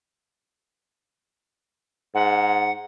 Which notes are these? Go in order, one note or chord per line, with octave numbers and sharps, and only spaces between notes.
G#2 F#5